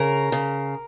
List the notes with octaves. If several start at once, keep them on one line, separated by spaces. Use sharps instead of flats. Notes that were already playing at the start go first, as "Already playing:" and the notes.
Already playing: C#3 A#4
C#3